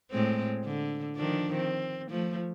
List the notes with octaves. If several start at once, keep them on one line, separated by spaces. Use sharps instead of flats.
A2 G#3 C4
D3
D#3 F3 D4
C4
F3 A3